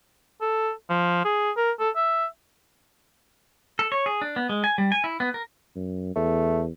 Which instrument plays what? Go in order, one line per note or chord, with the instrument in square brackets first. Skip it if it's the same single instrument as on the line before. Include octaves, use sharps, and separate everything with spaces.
[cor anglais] A4
F3
G#4
A#4
A4
E5
[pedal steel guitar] A4
C#5
G#4
D4
B3
G#3
G#5
G3
G#5
E4
B3
A#4
[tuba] F#2
[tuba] E2 [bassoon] A3